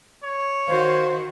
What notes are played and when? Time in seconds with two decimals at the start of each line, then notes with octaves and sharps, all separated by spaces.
0.23 C#5
0.68 D#3 F#4 C5 F5